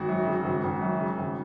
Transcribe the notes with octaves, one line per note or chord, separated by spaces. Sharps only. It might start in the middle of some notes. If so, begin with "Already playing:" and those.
Already playing: G#1 F#4
F#2
C#3
G#1
G#1
F#2
C#3
G#1